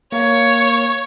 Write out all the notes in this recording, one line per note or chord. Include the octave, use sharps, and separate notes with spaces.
A#3 A#4 C#5 F5